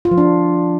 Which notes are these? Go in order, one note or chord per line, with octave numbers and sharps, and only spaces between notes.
F4
F3
D4